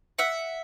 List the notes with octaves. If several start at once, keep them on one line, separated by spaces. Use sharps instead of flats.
E5 F#5